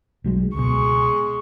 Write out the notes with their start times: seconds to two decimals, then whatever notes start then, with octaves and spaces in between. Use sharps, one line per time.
0.24 B1 F#3 G#3
0.55 C#2 B2 G#3 C#6